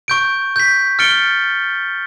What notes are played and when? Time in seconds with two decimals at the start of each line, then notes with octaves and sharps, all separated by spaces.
0.08 C#6 G6 D7
0.56 G6 B6
0.99 F6 A6 C#7 D7 G7